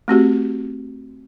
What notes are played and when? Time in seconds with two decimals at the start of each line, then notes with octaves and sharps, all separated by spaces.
0.08 A3 C4 F#4 G4